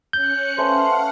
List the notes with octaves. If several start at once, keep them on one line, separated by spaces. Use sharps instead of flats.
C#4 F#6 G6 C#7
A3 B3 C#4 C5 F5 F#5